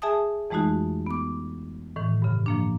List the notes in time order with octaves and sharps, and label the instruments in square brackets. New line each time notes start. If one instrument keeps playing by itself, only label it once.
[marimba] G#4 E5 G#5 A5 D#6
F2 E3 G#3 A3 D#4 F#4
B3 D6
A2 D#3 E3
G2 C#3
F3 A#3 D4